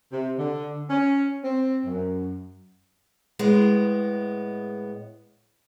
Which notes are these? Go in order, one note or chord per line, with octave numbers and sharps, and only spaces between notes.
C3
D3
C#4
C4
F#2
A2 G#3 B3